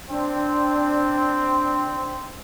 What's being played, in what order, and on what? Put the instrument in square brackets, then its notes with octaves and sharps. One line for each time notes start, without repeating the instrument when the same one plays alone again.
[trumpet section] C4 [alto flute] D4